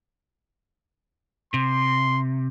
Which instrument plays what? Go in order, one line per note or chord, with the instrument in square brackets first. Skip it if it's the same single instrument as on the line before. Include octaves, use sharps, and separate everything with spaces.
[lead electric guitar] C3 [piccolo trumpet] C6